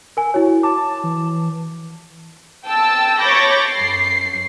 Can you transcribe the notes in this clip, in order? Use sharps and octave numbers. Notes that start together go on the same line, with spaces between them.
A#4 G#5
E4 F#4 C#5
A5 D6
E3
G5 A5 E6
C#5 B5 D6 G6 A6 A#6
F#2 C7